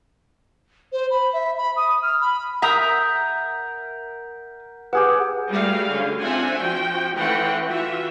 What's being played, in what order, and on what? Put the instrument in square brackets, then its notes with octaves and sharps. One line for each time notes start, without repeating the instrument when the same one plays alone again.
[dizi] C5
B5
E5
B5
D#6
F6
B5
[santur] A#4 [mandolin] E5 A#5 D#6 [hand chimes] F#5 G6 B6
[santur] G4 G#4 F#5 [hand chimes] B4
[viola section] G3 A3 F#4 G#4 F5
D3 C#4
C4 D4 F4 E5 F#5 G#5
F3 F#4 G5
E3 A3 C#4 F#5 G5 C6
E3 F4 F#4 E5